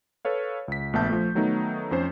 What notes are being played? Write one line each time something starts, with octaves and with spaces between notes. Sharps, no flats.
A4 B4 C#5 F5
C#2 B6
A#1 A3 B3 E5 A5 G6
F3 A3
D#3 F#3 A3 B3 D#4
F2 C#4 C5